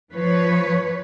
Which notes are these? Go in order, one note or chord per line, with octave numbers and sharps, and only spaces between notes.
F3 B4 C#5